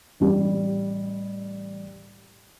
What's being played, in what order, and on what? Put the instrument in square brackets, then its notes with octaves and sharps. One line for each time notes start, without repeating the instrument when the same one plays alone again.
[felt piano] A1 G3